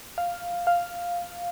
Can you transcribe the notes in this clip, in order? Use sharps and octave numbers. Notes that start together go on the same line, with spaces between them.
F5
F5